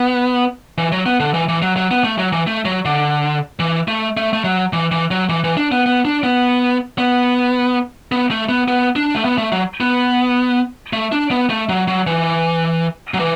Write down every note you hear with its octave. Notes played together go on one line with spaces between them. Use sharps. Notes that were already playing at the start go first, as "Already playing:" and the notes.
Already playing: B3
E3
F#3
B3
D3
E3
E3
F#3
F#3
B3
A3
F#3
E3
A3
F#3
D3
E3
A3
A3
A3
F#3
E3
E3
F#3
E3
E3
D4
B3
B3
D4
B3
B3
B3
A3
B3
B3
D4
A3
B3
A3
F#3
B3
A3
D4
B3
A3
F#3
F#3
E3
F#3
E3